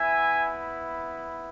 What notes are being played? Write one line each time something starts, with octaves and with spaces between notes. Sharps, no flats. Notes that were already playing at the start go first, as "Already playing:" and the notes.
Already playing: B3 E4 E5 G#5